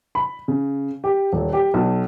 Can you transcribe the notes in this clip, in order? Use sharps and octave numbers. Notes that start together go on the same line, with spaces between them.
B5
C#3
G4
D#1
G4
B1